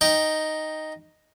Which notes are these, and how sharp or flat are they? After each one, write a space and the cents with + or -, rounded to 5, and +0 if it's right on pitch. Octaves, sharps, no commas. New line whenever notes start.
D#4 +0 G5 +0